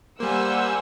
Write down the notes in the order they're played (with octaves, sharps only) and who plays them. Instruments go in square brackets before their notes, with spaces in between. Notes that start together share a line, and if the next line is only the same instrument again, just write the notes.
[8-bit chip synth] G3 A#3 [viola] C5 G#5 [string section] F#5 E6